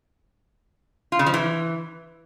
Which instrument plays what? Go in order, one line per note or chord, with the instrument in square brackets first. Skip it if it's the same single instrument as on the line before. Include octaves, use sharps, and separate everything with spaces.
[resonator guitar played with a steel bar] F4
C#3
F3
E3